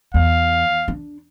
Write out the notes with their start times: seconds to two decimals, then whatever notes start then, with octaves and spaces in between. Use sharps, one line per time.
0.14 E2 F5
0.88 D4